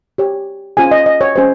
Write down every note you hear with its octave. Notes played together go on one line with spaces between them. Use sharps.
G4 C#5
C#4 F4 G#4 C5 G#5
D#5
D#5
C#5
C#4 G#4 C5